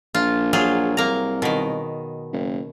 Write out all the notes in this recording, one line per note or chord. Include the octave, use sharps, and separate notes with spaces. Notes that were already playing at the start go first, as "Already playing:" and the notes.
A#1 F4
F#3 F4 G#4
C2 A#3 A#5
B2 D#3
F#1